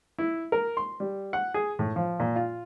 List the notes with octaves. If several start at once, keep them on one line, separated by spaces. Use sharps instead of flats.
E4
A#4
C6
G3
F#5
G#4
A2
F3
A#2
F4